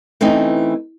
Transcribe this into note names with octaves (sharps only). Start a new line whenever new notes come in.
E3 A3 C4 C#4 D#4